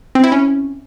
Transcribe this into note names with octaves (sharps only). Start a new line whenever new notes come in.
C4
E4
C#4